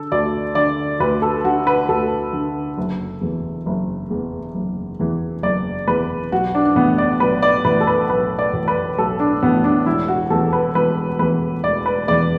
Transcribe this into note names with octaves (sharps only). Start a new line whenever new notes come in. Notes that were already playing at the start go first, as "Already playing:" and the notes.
Already playing: D3 A4
D2 D5
D3 D5
D2 B4
A4
D3 F#4
B4
D2 A4
D3
F#1
E2 E3
F#1
E2 E3
F#1
E2 E3
F#1 D5
E2 E3 B4
B1 F#4
D4
D4
A2 E3 B3
D5
B1 B4
D5
A2 E3 B4
A4
B4
B1 B4
D5
A2 E3
B4
B1 A4
D4
A2 E3 B3
D4
E1 E4
F#4
E2 E3 A4
B4
E1 B4
E2 E3 B4
E1 D5
B4
E2 E3 D5